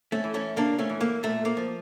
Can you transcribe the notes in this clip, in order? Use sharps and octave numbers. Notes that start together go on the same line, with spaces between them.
A3 C#4
E3
A3 C#4
C#3 A#3 D4
A3 C#4
E3
A#3
A#2 A3
A#3
F3